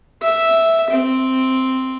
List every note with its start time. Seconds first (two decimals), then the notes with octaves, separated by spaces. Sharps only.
0.22 E5
0.90 C4